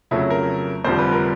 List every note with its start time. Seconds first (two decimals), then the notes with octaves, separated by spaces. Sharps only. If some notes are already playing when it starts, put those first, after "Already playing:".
0.11 F2 C#3 F#3 A3 E4
0.30 A#4
0.84 F1 F2 D3 G3 C5
0.98 B4
1.12 A#4